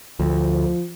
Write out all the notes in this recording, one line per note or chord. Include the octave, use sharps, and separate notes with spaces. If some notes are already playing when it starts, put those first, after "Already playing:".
D2 F3